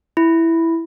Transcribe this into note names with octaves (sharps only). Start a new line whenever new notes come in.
E4